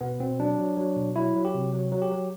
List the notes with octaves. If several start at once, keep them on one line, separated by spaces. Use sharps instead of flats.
B2 B3
B2 C4
F#3 D4
F#3
F#3
B2
F#3 E4
F#3
G4
C3
F#3
F#3
G4
F#3